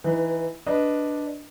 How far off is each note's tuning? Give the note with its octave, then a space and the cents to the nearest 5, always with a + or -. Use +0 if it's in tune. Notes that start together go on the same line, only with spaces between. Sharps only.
E3 +0 D#4 +0 B4 +30
D4 +0 B4 +0 D#5 +0